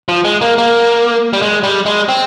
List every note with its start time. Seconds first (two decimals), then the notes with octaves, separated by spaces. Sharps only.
0.09 F3
0.25 G#3
0.41 A#3
0.58 A#3
1.33 G3
1.42 G#3
1.63 G3
1.86 G#3
2.09 C4